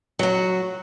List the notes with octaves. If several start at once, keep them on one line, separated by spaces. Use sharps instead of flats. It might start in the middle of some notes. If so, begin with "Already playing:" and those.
F#3 F#4